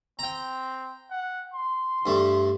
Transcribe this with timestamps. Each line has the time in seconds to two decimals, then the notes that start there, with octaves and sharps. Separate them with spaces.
0.19 C4 G5 A#5
1.10 F#5
1.54 C6
2.06 G2 A3